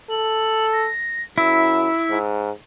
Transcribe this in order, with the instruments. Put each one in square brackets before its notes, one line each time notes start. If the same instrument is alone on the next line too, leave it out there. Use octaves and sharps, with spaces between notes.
[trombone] A4 [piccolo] F#7
[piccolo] A#6
[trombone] F#2 [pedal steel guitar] E4 [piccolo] E6
[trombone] G#2